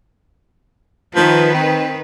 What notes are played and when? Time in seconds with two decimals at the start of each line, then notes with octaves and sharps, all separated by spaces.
1.15 D#3 F3 B4
1.54 C4